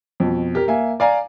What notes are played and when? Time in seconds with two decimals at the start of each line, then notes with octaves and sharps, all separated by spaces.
0.20 F2 B2
0.55 G4 A#4
0.68 A#3 E5 G#5
1.00 D5 F5 G#5 A#5